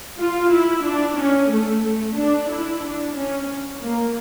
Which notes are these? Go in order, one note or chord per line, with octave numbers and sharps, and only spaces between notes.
F4
E4
D4
C#4
A3
A3
D4
E4
D4
C#4
A#3